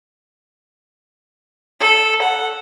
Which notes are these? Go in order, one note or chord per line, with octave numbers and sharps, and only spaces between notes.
A4
F#5